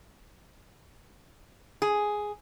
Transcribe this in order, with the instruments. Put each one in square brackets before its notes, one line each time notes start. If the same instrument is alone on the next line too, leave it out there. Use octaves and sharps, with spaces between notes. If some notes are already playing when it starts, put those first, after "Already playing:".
[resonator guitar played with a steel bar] G#4